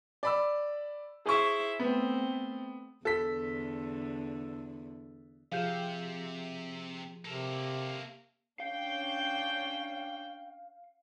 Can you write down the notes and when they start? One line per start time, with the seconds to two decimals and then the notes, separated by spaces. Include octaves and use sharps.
0.23 D5 B5 E6
1.26 E4 G#4 C5 E5 C#6
1.79 A3 B3 C4
3.05 E2 D3 A4 B6
5.52 C3 F3 G4 G#4 F5 G6
7.25 C3 A#3 A4
8.60 C#4 D4 F5 G5